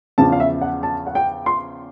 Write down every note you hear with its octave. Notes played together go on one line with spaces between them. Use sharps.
E2 C#3 F3 A5
F5
E5
F#5
A5
F#5
G5
C6